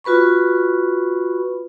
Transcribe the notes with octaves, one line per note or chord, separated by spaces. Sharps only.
F4 F#4 B4 B5 C#6